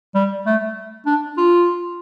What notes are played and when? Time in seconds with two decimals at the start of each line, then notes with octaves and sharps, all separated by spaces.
0.15 G3
0.46 A3
1.06 D4
1.37 F4